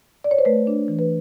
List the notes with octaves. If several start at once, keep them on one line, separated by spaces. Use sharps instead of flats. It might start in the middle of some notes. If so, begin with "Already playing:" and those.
D5
C#5
C5
A3 B4
D4
E3
B4